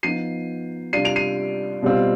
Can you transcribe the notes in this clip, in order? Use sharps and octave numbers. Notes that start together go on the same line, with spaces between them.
F3 B3 D#4 C7 D#7
C3 G3 D4 F4 C7 D#7
D7 F7
C7 D#7
B2 G3 C4 F4